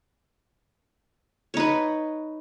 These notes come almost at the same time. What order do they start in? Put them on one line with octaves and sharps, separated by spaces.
C#5 D#4 B4